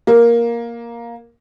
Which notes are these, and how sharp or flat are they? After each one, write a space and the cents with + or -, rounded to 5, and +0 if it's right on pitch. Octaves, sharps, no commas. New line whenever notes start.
A#3 +10